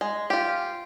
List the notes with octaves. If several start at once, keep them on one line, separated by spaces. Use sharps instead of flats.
G#3
F4 G4